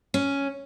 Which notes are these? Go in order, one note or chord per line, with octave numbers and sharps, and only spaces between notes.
C#4